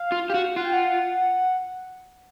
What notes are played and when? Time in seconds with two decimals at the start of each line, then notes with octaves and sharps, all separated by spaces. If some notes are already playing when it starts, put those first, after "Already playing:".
Already playing: F5
0.12 F4
0.30 G4
0.34 F#4
0.56 F4 F#5
0.65 G5
0.73 F#5